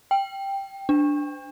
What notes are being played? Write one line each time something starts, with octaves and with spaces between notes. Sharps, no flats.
G5
D4